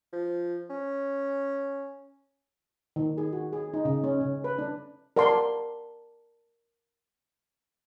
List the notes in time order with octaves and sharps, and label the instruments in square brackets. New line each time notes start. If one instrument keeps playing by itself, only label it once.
[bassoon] F3
C#4
[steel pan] D#3
G#4
F#4
G#4
D#4
C#3
C#4
C#3
B4
D4
A#4 D5 F#5 A5 C6